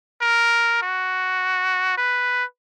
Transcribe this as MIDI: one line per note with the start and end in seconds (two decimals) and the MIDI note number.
0.22 0.80 70
0.82 1.96 66
1.97 2.44 71